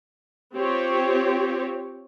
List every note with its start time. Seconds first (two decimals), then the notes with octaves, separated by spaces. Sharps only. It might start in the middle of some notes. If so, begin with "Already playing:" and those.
0.54 C4 F4 G4 C#5